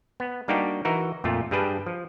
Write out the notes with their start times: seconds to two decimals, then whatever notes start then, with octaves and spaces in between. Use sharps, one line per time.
0.20 B3
0.48 G3 A#3 D4 D#4 F#4 G4
0.85 E3 D#4 F#4 A#4
1.24 F2 A#2 A3 F4
1.51 G2 G3 G#4 B4 G5 A5
1.87 F3